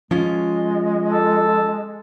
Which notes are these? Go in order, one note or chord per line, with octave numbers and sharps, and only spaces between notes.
F3 G#3 C#4 F4
A4